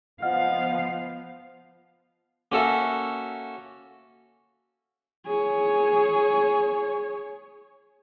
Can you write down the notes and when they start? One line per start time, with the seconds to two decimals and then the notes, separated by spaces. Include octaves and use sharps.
0.22 F3 B3 D#5 F5 F#5 F6
2.52 A#3 C#4 F#4 A4 E5
5.26 G#4 C#5